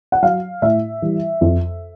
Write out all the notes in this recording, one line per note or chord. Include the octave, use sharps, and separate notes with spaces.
F#5
F#3 F5
A2 E5
E3 G3
F2